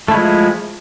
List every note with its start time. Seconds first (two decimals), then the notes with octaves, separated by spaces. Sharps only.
0.08 A3
0.11 E4
0.14 G#3
0.17 F3